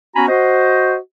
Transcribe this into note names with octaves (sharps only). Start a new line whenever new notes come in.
B3 C#4 F#4 G#5 A#5 B5
F#4 C5 D#5